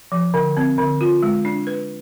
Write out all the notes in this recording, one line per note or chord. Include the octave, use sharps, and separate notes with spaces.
F3
D3
C4
D3
F4
G#3
D4
B4